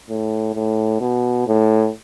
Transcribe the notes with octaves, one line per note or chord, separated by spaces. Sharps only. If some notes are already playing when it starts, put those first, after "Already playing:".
A2
A2
B2
A2